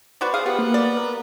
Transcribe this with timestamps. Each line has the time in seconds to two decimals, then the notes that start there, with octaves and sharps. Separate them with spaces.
0.21 B3 F#4 C5 D5
0.34 G#4 F5
0.46 B3 F4 G4
0.59 A#3
0.74 D5
0.97 A#4